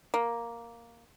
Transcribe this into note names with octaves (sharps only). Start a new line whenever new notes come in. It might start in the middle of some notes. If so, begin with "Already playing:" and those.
A#3